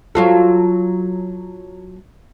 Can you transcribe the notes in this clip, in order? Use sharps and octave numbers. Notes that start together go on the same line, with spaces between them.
F#3 F4 A4